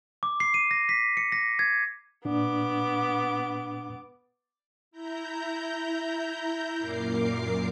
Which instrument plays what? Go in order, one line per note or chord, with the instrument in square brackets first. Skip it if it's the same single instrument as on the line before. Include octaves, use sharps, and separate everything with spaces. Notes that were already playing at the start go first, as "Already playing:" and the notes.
[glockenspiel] D6
C7
D#7
A#6
B6
C#7
A#6
G#6
[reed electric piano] A#2 D4 [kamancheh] B3 D6
[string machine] E4 A#5 G6
F#2 A#2 A#4 D6 C7